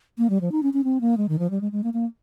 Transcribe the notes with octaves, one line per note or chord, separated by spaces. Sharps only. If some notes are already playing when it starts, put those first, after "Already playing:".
A#3
G3
F3
D#4
C#4
C#4
C4
A#3
G#3
D#3
F3
G3
G#3
G#3
A#3
A#3